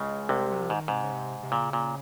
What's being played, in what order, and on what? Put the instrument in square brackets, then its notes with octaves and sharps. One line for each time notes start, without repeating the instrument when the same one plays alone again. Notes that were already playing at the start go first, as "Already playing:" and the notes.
Already playing: [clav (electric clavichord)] C#2 C#3 [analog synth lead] G#3
[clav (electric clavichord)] C2 C3
[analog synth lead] F#3
F3
[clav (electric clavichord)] G#2 [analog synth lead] D#3
[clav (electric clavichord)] G#2 [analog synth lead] C3
[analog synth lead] C#3
C3
C3
[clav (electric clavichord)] A#2 [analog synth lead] C#3
[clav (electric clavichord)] A#2